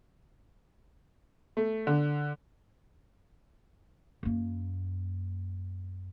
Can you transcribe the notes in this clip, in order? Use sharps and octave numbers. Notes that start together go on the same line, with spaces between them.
A3
D3
F#2 A#3